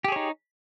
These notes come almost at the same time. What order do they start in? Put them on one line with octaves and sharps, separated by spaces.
G4 G#4 C#5 D#4